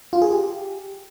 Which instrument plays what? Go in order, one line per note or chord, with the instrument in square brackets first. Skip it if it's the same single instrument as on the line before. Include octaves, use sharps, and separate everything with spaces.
[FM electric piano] F4
G#4
G4